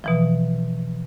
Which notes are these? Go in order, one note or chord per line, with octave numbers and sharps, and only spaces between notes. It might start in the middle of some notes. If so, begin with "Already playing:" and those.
B2 E3 F3